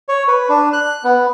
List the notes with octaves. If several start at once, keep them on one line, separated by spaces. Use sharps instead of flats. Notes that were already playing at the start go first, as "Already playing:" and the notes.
C#5
B4
D4
F#6
B3